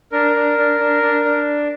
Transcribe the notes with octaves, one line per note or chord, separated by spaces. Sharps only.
D4 A#4
D4
D4
D4
D4
D4